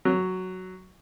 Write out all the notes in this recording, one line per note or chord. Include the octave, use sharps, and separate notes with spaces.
F#3